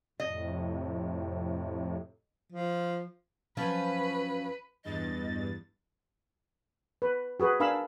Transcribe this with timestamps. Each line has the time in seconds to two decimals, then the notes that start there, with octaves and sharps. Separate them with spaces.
0.20 F2 A2 C3 D#5
2.53 F3
3.57 F3 F#3 C#4 B4
4.85 E2 G2 D#5 A6
7.02 B4
7.40 F#4 G#4 B4
7.60 D4 A#4 F5 G#5 B5 E6